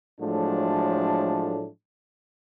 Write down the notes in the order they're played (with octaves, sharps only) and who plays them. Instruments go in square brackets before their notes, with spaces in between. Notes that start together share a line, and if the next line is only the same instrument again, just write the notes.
[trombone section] A2 F3 F#3 G#3 A3 D4